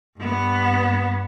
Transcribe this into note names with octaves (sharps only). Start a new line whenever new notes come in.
G2 B3